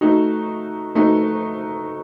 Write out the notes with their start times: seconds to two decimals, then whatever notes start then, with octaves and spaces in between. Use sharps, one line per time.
0.01 A3 D#4 F#4
0.95 A3 D#4 F#4